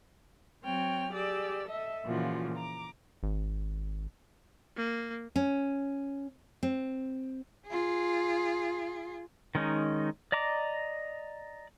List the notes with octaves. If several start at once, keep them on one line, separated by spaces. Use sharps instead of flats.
F#3 C4 C#5 G5 F6
G4 G#4 D5 E6
A4 D#5 E5
A#2 C#3 E3 F3 F4 F#4
A#5 D6
G#1
A#3
C#4
C4
F4 G#4
D#3 G#3 C#4 D#4
D5 D#5 A#5 D6